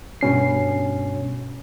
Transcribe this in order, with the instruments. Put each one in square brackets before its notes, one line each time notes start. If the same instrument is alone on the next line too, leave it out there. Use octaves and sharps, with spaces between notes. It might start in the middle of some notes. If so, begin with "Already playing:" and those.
[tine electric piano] G2 B2 C#4 C7